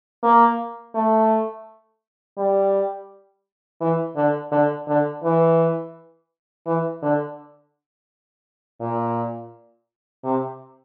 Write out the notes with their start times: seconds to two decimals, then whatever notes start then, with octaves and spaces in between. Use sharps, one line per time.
0.23 A#3
0.94 A3
2.37 G3
3.81 E3
4.16 D3
4.51 D3
4.87 D3
5.23 E3
6.66 E3
7.02 D3
8.81 A#2
10.24 C3